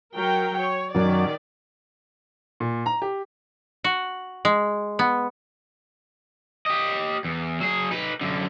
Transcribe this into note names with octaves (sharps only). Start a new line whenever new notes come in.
F#3 A#4 G5
C#5
F#2 D#3 F#3 D5
A#2
A#5
G4
F#4
G#3
B3
G4 D#5
E2
F#3 G#4
D#4 B4
F#2 D3